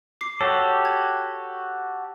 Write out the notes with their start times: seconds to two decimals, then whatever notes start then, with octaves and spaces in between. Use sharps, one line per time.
0.21 D6 C7
0.41 F#4 G4 A4 C#5
0.85 G#6